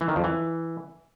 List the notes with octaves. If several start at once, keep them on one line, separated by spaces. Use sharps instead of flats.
E3
D#3
F2
E3